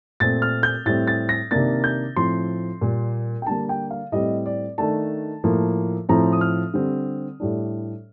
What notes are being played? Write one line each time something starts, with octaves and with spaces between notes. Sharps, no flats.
A#2 A3 C4 A6
F6
G6
A2 G3 C4 A6
A6
A#6
C3 D#3 A#3 D4 A6
G6
A2 F3 C4 C6
A#2 G3 A#3
G5
D3 G3 A#3 A5
G5
F5
A2 G3 C4 D#5
D5
D#3 A3 D4 A5
A2 F3 A#3
A2 F3 C4 A#5
D#6
F6
D3 G3 C4
A2 G3 D4